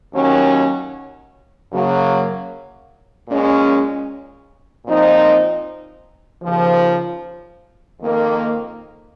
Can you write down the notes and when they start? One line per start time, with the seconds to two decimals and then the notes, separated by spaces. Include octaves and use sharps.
0.14 D#2 D#3 F#3 C#4
1.71 F#2 C#3 F#3 A#3
3.29 A#2 G#3 C#4
4.86 A#2 F3 C4 D#4
6.43 D#2 C#3 F3
8.01 F2 D#3 A#3